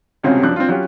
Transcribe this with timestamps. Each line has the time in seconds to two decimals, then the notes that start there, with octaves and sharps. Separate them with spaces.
0.23 D#1 C#2 C3 C4 C#4 F#4
0.43 F#2 F3 D4 F#6
0.56 C4 D4 F4
0.69 F#3 C#4 F4 G4